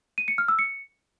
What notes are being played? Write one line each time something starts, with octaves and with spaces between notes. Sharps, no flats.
D#7
C#7
F6
E6
C#7